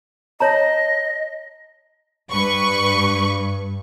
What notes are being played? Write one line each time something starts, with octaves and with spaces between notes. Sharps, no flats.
C#5 D#5 A5 A#5
G2 B4 C#6